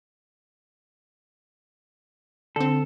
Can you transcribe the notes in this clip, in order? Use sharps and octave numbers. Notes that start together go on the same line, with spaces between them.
D3 C4 A4